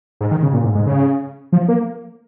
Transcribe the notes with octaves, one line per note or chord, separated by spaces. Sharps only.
G#2
D#3
C#3
A#2
G#2
G#2
C#3
F3
A#3